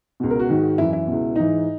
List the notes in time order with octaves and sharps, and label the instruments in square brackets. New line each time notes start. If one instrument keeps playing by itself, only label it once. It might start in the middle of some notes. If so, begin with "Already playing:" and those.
[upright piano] C#2 B2
A#4
F#4
G#2 D#3
F#2 E3 E4
E4
C#2 B2
G#2 E3 D#4